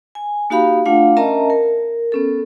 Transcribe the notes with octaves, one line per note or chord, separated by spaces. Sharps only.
G#5
A#3 D#4 F#4 G4 F5 B5
A3 D4 F4 F5 F#5
C#4 A#4 D#5 E5 A5 A#5
A#4
B3 C#4 A4